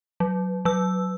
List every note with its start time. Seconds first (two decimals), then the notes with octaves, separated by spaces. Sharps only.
0.20 F#3
0.65 F#3 E6